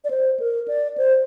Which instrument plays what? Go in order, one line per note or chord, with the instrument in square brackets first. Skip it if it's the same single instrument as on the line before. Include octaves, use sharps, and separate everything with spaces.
[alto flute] D5
C5
A#4
D5
C5